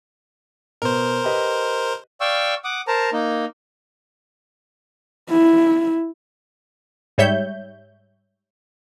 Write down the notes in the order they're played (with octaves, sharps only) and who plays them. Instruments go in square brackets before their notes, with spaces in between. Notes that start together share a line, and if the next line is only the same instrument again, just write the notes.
[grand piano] B2 B3 [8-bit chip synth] A#4 C5
[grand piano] G4 B4 D#5
[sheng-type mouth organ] D5 F5 G5 C#6 E6
F#5 D6 D#6
A#4 C5 A5 A#5
A#3 D#4
[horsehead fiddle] E4
[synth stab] G#2 G3 C#5 E5 G6